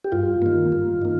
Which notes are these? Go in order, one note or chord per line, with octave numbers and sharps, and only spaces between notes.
G4
G2 F4
D#3 A#3
G2
D#3 A#3